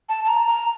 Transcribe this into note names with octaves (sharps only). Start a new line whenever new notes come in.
A5
A5
A#5
A#5